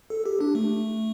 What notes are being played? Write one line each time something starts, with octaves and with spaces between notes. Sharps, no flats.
A4
G4
D4
A3